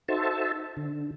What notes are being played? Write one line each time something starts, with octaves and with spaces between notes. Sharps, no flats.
D#4 F#4 A4 C5 E5 A5
D3